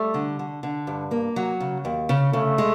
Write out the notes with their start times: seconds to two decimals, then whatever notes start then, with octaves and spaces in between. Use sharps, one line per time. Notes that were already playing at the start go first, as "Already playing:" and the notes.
Already playing: G3 A3
0.14 D3
0.39 D3
0.63 D3
0.87 G2
1.11 A#3
1.36 F#3
1.60 C#3
1.85 D#2
2.09 C#3
2.33 C#3 A3
2.58 G#3